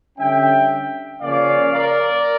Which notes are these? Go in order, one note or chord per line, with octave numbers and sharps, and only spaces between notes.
D3 G3 C#4 E5 G5
C#3 F3 A#3 C#4 D5 F5
A#4 D5